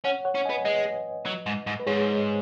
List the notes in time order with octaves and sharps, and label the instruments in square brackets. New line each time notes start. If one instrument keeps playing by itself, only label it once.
[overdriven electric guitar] C#4 [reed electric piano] C#5 F#5
[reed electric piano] C#5 F#5
[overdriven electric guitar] C#4
[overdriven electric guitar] B3 [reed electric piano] D#5 G#5
[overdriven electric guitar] G#3 [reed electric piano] B4 D#5
[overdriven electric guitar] F#3
G#2
G#2
[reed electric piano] B4
[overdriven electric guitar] G#2 [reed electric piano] G#4 C#5